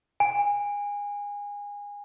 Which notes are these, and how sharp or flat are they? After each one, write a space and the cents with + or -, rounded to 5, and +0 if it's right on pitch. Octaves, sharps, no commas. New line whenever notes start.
G#5 -25